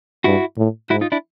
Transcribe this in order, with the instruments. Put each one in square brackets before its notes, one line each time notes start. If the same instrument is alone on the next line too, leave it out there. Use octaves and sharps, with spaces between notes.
[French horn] G2 [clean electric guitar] E4 F#4
[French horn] A2
[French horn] G#2 [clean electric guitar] E4 F#4
[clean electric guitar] D#4 F4
D4 E4